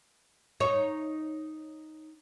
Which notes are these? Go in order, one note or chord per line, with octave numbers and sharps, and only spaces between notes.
D#4 C#5